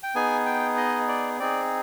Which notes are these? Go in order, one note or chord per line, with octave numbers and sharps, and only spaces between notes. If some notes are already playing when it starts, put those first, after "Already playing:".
G5
B3 D#4 G#4 G#5
G5
D#5
D5
C4 D#4 G#4 D5